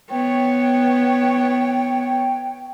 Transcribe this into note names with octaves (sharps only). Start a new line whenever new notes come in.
B3 C#5 G5